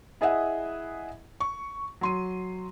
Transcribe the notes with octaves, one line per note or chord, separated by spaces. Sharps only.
E4 G#4 D#5 E5 F#5
C#6
F#3 C6 D#7